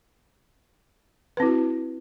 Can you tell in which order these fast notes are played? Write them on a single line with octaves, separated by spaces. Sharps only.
B4 C4 E4 F#4